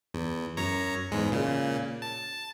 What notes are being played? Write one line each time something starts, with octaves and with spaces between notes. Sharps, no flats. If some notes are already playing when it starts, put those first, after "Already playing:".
E2
F#2 C#5 A#5
E2 G#2 G#3
A#2 C#3
A5